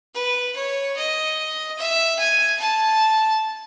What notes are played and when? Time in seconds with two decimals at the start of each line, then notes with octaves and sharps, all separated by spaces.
0.15 B4
0.56 C#5
0.97 D#5
1.79 E5
2.19 G#5
2.60 A5